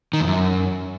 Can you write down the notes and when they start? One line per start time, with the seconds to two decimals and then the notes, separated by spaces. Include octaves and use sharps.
0.13 D#3
0.20 E2
0.27 F#2